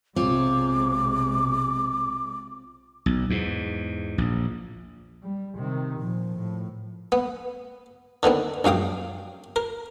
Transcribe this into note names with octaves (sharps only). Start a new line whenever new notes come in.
B1 C3 G#3 C4 F4 C#5 D6
B1
E2 G#2
A#1
G3
C3 D#3
A#2 F3
A2
B3
D3 D#3 B3 C4
A#1 F#2 F5 G5 D#6
A#4